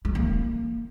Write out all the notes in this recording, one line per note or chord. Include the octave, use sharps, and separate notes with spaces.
G#3
A#3